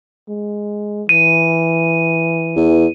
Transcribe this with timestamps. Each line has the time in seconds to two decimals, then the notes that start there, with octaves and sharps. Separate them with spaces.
0.29 G#3
1.09 E3 D#7
2.56 E2